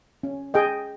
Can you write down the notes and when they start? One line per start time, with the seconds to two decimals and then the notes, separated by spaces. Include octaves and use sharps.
0.23 C#4
0.54 G#4 D#5 G5